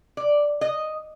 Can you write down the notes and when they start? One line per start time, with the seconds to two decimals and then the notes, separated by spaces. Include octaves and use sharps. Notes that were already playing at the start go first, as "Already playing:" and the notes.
0.17 D5
0.61 D#5